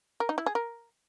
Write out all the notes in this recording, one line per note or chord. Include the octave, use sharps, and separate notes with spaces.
A#4
D#4
E4
G#4
A#4